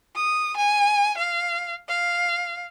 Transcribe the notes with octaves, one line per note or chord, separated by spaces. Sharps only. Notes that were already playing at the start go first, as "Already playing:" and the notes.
D#6
G#5
F5
F5